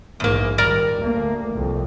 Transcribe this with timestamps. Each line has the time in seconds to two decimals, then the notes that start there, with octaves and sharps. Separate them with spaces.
0.20 A#1 E2 G#2 A#3
0.58 D#2 G3 A#4 D5 A#5
1.00 D2 A#3
1.52 C2 F2